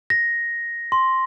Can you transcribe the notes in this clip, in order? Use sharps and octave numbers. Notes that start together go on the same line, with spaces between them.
A#6
C6